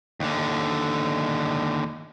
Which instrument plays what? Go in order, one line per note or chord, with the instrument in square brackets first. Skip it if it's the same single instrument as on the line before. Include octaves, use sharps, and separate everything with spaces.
[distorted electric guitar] D#2 D3